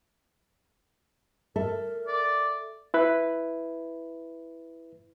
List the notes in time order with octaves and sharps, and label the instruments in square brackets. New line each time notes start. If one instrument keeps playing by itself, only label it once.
[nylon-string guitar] A4 E5 [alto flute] A#4
[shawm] D5
[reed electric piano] E4 B4